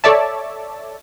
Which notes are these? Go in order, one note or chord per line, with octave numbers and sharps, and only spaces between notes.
A4 C#5 D5 E5 A5